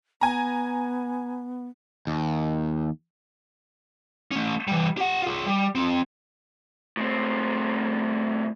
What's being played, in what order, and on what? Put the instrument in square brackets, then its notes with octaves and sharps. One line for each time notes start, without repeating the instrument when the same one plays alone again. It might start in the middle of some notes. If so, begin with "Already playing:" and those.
[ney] B3 [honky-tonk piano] G#5 A#5
[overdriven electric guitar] D#2
[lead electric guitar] A3 C#4
E3 G3
G4 F#5
F4 G#4
G3
C4 F4
[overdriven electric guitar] A2 C4